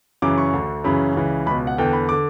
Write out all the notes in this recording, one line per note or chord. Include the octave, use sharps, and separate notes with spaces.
F#2 C#3 E3 D6
C#6
D2 D3
F#2 C#3 E3 B5
C#2 C#3 E3
C#2 B2 B5
F#5
E2 D3 G5
B5
D3 D6